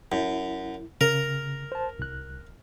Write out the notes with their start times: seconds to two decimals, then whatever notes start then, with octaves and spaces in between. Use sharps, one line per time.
0.12 F#2 E4
1.01 C#3 A#4
1.72 C5 A5
1.99 C2 F#6